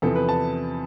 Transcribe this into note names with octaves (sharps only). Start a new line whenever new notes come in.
E2 C3 F3 B3 A4
B4
A5